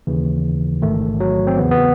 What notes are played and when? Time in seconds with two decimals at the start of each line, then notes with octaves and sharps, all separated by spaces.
0.07 D#2 C#3 E3
0.82 A1 G#2 D#3 A3
1.20 F#3
1.47 C4
1.57 E2 C#3 E3 B3
1.71 B3